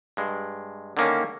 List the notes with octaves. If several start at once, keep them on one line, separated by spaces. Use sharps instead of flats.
G2 G#3
D3 D#3 A#3 C#4